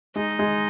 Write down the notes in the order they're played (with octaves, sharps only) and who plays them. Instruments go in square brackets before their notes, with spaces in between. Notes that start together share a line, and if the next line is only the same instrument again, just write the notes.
[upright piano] G#3 [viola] D#4
[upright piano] G#3